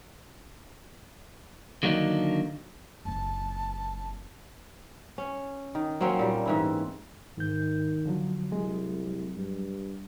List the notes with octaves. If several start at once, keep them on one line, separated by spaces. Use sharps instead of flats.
D3 D#3 F#3 A#3 D4 D#4
F#1 C4 A5
C#4
D#3
F#3 A#3 C4 C#4
A#2 G3
G#2 E3 E4
G#2 D#3 G6
D3 F3 F#3
C2 F#3 G#3
G2